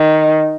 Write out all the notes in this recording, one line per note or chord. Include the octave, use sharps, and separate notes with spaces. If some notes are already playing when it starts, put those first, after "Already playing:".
Already playing: D#3